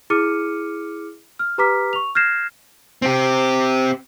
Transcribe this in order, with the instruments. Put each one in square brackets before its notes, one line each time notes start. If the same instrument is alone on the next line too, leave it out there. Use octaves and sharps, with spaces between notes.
[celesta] E4 G#4 D6 F6 C#7 D#7
F6
G4 B4 A#5 D6 F6 B6
C#6 F7
F6 G6 G#6 A#6 C7 E7
[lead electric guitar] C4 G4